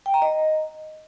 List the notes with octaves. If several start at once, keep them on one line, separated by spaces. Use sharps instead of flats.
G5
A#5
D#5